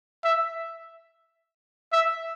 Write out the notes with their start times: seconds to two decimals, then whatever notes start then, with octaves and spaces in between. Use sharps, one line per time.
0.24 E5
1.93 E5